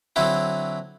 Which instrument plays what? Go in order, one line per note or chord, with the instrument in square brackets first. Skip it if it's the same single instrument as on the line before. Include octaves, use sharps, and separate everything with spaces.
[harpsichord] D3 F#3 C4 E4